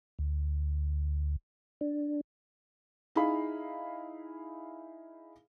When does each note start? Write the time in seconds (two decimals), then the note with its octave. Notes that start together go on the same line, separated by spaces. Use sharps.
0.19 D2
1.81 D4
3.16 D#4 E4 G#4 F5 B5